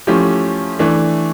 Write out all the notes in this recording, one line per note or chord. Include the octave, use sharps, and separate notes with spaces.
F3 A3 C#4 E4 G4
E3 A3 D4